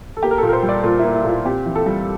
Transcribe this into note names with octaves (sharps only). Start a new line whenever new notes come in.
A4
A#3 G4
A#4
A#2 A4
A#4
C5
G3
D5
A#2 F4
A#3 E4
E4
A#2 E4
C4 G4
E3
A4
G3